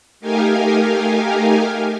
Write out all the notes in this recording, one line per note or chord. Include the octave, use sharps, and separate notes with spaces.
A3 D#4 G4 A#4 F5 G#5